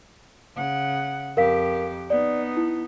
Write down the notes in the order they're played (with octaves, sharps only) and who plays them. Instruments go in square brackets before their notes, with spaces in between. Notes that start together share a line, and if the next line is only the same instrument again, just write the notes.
[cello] C#3 F#5
[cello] F2 G4 [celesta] A#4 F5 B6
[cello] B3 D#4 [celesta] D5
[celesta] E4